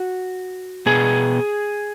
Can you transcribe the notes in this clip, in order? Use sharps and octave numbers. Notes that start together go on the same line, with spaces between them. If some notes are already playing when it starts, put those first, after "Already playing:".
Already playing: F#4
B2 B3 G#4